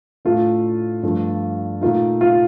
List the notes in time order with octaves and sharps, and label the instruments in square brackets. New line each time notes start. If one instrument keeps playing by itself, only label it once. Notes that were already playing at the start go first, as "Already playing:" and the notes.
[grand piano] A2 A3 D4 [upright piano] F4
[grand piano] G2 F3 A3 D4
[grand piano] A#2 A3 D#4 [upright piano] F4
[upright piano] F4